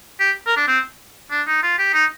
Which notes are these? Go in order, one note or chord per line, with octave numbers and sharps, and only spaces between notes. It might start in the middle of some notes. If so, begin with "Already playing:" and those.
G4
A#4
D4
C4
D4
D#4
F4
G4
D#4